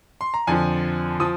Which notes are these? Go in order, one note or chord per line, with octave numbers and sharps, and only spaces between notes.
C6
A#5
F2 D3 F3 G#5
F3 D#6